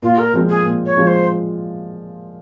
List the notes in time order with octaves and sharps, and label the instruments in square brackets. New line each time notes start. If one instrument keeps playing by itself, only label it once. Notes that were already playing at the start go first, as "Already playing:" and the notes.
[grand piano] A#2 [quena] F4
[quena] A#4
[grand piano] F3 G#3 C4 F4
[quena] G#4
[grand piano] A#2
[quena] C#5
[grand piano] F3 G#3 C4 F4
[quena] C5